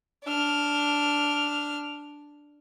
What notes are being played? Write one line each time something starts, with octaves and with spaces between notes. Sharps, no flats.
D4 F6